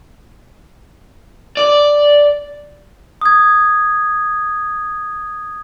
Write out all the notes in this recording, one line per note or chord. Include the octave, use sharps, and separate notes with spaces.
D5
D#6 G#6